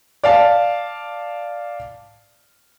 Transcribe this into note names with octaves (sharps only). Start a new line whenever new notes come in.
D5 F5 A5